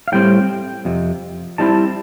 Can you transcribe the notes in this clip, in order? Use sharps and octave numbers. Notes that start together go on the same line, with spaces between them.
F5
A2 G3 C4 G5
F2 C3
A2 G3 C4 E4 A5